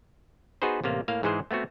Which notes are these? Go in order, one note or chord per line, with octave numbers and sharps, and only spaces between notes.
B3 D#4 F#4 G#4 B4 C5
A1 C3 A#3 F5
A2 A#3 F5
G#2 E3 G#3 G#4 C5
A3 B3 C4 F#4